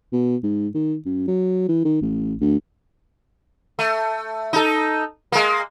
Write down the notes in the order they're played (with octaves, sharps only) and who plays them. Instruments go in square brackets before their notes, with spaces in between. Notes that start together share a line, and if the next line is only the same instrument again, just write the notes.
[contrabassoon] B2
G#2
D#3
F#2
F#3
E3
D#3
A1
D2
[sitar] A3
D#4 A4
G#3 A#3